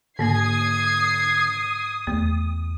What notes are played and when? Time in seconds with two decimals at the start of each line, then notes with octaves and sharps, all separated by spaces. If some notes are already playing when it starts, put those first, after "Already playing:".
0.19 G#2 D3 A#3 G#5 D#6 G#6 C7
2.07 E2 A3